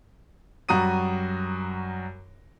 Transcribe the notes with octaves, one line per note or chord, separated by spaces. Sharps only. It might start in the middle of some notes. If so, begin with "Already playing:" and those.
F#2 G3 F#4 A#5 D#6 D#7